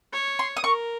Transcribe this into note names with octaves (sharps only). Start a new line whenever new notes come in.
C#5
C6
D#6
A#4 C#6